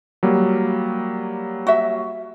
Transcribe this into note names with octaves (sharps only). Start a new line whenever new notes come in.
F#3 G3 A#3
F#4 E5